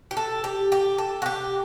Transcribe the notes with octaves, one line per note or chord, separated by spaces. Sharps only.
G4
A4
G4
G4
A4
F#4
G4